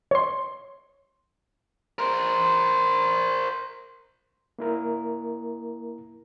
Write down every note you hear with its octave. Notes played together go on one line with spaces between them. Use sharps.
C#5 C6
A#4 C5
A#3 E4 A#4